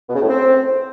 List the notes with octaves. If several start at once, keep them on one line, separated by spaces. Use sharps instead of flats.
B2
C#3
A2
C4